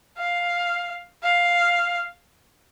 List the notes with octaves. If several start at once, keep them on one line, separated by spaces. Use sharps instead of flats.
F5
F5